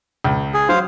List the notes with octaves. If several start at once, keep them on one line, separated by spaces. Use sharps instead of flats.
C#2
G#4
F#3 C5 F5